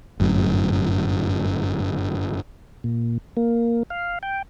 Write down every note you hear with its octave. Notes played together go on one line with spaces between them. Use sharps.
G1 F#2 A2
A#2
A#3
F5
G5